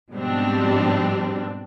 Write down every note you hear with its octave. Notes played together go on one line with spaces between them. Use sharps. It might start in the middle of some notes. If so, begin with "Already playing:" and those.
G#2 B2 F3 G3 C4 D4